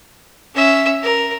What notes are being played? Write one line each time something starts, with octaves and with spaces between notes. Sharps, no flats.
C#4 E5
A#4